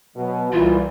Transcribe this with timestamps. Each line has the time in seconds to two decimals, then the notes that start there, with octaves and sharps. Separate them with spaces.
0.16 B2 F#3
0.53 C2 A#2 E3 F4